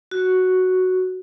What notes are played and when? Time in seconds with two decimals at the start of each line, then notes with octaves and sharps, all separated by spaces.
0.11 F#4